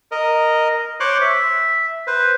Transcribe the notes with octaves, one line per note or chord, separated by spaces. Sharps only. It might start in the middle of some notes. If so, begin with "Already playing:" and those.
A#4 D#5
C5 C#5 C6 D6 F#6
E5
B4 C5